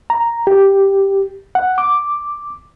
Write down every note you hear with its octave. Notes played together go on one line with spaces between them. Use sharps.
A#5
G4
F#5
D6